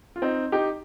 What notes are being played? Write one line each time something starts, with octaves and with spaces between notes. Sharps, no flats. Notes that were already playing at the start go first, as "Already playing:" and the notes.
F4
C4 D#4
D#4 G4